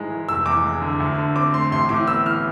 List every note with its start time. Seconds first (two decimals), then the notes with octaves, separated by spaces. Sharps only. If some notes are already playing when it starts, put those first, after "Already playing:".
Already playing: G#1 G#2 E3 G#3
0.10 E3
0.28 F1 E6
0.46 E2 D6
0.64 G#3
0.81 D3
1.00 D2
1.18 D3
1.36 C4 D6
1.54 A3 C6
1.72 A1 C6
1.89 A2 D6
2.07 B3 E6
2.25 E3 F6